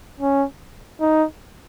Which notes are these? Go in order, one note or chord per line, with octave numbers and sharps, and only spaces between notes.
C#4
D#4